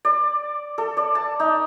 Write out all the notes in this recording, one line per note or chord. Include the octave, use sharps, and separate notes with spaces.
D5
A4
D5
A5
D#4